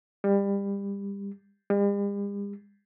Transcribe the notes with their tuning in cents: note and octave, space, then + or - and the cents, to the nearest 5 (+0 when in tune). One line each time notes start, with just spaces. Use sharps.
G3 +25
G3 +45